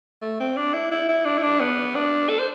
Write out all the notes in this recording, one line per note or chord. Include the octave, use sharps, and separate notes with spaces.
A3
C4
D4
E4
E4
E4
D4
E4
D4
B3
D4
A4
C5